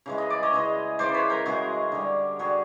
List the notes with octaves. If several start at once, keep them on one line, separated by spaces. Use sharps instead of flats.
C#3 E3 G#3
D#5
D5
C#5 D#5
C#3 E3 G#3
C#3 E3 G#3 C5 D5
B4 C#5
A#4 C5
C#3 E3 G#3 F#4 G#4
D3 G3
D3 G3 F#4 G#4